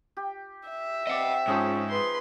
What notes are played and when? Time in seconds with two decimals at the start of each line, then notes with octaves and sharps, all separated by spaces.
0.17 G4
0.69 E5
1.07 C4 D5 D#5 F#5
1.48 G#2 F3 C#4 D#4 G#4
1.89 B4 C6